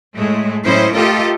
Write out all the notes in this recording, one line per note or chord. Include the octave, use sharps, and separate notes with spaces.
A2 G#3 A3
A2 F#3 C#4 E4 C5 D#5
A3 F4 G4 A4 A#4 D#5